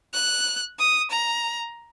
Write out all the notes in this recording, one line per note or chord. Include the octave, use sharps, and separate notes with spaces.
F#6
D#6
A#5